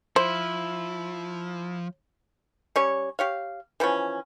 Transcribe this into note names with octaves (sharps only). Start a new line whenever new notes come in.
F3 E4 C5
G3 C#4 C#5
G4 C#5 F5
E3 F3 B3 C#4